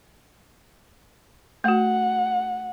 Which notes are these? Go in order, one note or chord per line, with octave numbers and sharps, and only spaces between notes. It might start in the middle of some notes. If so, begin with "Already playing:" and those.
A3 F#4 F#5